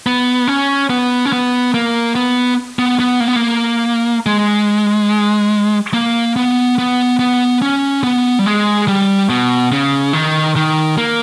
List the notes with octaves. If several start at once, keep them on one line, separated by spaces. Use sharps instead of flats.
B3
C#4
B3
C#4
B3
A#3
B3
B3
B3
A#3
B3
A#3
G#3
A#3
B3
B3
B3
C#4
B3
G3
G#3
G3
B2
C#3
D#3
D#3
A#3